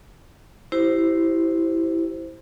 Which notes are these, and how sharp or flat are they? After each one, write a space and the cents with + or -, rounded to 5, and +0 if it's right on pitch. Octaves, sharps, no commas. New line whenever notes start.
E4 +0 G4 -20 C5 +0